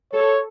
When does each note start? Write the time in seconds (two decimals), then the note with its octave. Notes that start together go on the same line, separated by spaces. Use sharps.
0.13 A4 C#5